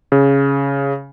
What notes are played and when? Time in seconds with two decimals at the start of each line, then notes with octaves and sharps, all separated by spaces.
0.12 C#3